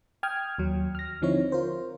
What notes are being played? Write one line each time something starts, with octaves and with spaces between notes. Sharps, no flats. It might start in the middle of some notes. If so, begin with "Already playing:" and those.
G5 D#6 F6 G#6
D#2 F#3
F6 A#6
D3 F3 C4 D#4 E4 C#5
F4 A#4 C5